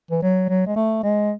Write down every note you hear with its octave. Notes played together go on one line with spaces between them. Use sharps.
E3
F#3
F#3
G#3
A3
G#3